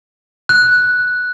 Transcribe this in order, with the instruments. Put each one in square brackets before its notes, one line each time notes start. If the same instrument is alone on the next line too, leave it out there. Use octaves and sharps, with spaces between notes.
[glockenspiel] F#6